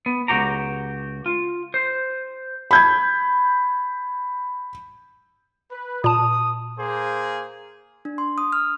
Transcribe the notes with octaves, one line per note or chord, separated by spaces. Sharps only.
B3
C#2 G2 F#4 G4 A#5
F4
C5
B5 G6 G#6
B4
A#2 A5 D#6
A#3 G#4 C5
D4
C6
D#6
F6